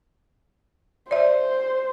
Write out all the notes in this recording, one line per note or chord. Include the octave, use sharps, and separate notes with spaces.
C5 D5 E5